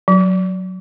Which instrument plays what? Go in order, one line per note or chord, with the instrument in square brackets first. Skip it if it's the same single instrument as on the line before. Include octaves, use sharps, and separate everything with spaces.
[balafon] F#3